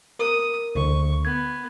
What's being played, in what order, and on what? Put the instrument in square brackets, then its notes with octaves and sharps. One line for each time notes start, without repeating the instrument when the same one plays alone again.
[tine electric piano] A#4 [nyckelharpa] D#6
[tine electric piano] D2 D3 [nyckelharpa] C#6
[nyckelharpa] B3 [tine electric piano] G#6